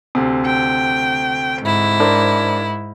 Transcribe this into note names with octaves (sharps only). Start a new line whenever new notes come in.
D2 C3
G5
G#2 E4
D4 A#4 C5